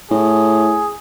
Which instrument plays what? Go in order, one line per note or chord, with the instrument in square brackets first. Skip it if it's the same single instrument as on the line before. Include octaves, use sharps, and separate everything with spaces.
[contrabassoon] A2 [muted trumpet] G#4